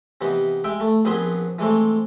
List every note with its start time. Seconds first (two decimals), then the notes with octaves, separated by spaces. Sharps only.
0.21 C3 E3 B3 D#4
0.64 G#3 E5 G5
0.80 A3
1.05 A#1 B3 C4 G#4 B4 C6
1.59 E3 G#3 A3 C4